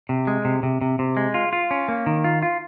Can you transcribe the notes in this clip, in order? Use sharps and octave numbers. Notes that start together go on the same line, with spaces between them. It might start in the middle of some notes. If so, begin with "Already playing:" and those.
C3
G#3
C3
C3
C3
C3
G#3
F4
F4
C#4
A#3
D#3
F4
F4